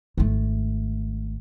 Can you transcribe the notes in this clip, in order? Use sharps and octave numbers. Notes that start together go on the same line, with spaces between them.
G#1 A3